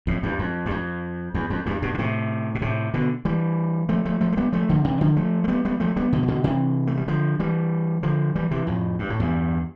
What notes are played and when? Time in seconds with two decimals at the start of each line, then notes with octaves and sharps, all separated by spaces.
0.07 F2 A2
0.23 E2 G2
0.39 F2
0.66 G2
0.71 F2
1.34 E2
1.50 F2
1.66 E2 G2
1.82 G2 B2
1.94 D3
1.99 A2 C3
2.55 B2
2.62 A2 C3
2.94 B2 D3
3.25 E3 G3
3.89 F3 A3
4.05 F3 A3
4.21 F3 A3
4.32 A3
4.37 G3 B3
4.52 F3 A3
4.69 D3 F3
4.84 C3 E3
5.01 D3 F3
5.17 F3 A3
5.44 A3
5.48 G3 B3
5.65 G3 B3
5.80 F3 A3
5.96 G3 B3
6.12 B2 D3
6.23 E3
6.28 B2 D3
6.44 C3 E3
6.87 A3
6.97 G3
7.08 D3 F3
7.40 E3 G3
8.03 D3 F3
8.35 E3 G3
8.51 C3 E3
8.67 F2 A2
8.99 G2
9.10 A2
9.20 E2 G2